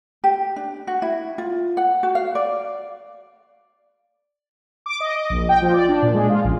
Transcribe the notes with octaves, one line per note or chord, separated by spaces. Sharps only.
G4
D4
F#4
E4
F4
F#5
F#4
F5
D5
D6
D#5
D#5
A#1
G5
F3
D5
D4
A#2
G#3
F4
A1